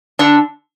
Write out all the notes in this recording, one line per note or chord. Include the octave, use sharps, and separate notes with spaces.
D3 D4